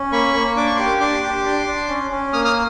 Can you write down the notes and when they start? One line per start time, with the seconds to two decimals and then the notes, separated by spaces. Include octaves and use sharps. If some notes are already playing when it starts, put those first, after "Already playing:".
Already playing: C#4
0.12 A#3 B5 C#6
0.34 A#3
0.56 D4 D6
0.66 C#6
0.75 G4 C6 D6
1.00 D4 C6 D6
1.23 G4
1.44 D4
1.67 D4
1.89 C#4
2.11 C#4
2.33 A#3 D#6 F6
2.44 D#6 F6